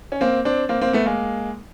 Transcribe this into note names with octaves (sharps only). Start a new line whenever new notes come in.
C#4
A#3 C4
C4 D4
A#3 C4
A#3 C4
A3 B3
G#3 A#3